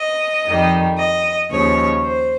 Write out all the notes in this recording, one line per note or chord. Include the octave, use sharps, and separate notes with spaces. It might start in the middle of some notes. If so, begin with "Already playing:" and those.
Already playing: D#5
F2 D#3 G3
D#5
D#2 C#3 F3 C#5
C5